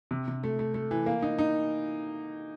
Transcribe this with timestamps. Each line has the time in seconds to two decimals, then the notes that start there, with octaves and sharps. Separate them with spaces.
0.11 C3
0.28 C3
0.43 A3
0.59 A3
0.74 A3
0.91 E3
1.06 A#3
1.22 D#4
1.39 D#4